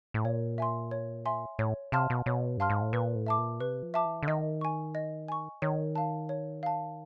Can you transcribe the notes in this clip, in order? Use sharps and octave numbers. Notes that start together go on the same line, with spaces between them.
A2
A#2 C#5
E5 G#5 C6
C#5
E5 G#5 C6
A2 C#5
C3 F5 A5 C6 F6
B2
B2 C#5
G2 F5 A5 C6 F6
G#2
A2
A#2 B4
A2
E5 A5 D6
A#2
C3 B4
F3
E5 A5 D6
E3
D3
D#3 D#5
G#5 C#6
D#5
G#5 C#6
D#3 C#5
F5 A5
C#5
F5 A5